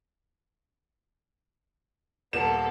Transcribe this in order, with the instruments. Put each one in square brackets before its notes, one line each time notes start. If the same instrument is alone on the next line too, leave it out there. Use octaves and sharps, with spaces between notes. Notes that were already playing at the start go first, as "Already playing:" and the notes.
[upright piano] D#1 A#3 E7 [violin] B3 A4